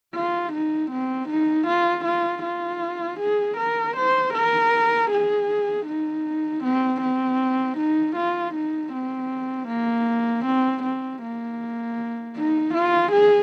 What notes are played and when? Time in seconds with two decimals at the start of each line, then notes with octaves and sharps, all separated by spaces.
0.14 F4
0.52 D#4
0.90 C4
1.28 D#4
1.67 F4
2.04 F4
2.43 F4
3.20 G#4
3.57 A#4
3.96 C5
4.33 A#4
5.10 G#4
5.86 D#4
6.63 C4
7.01 C4
7.77 D#4
8.16 F4
8.54 D#4
8.92 C4
9.68 A#3
10.45 C4
10.83 C4
11.21 A#3
12.36 D#4
12.74 F4
13.12 G#4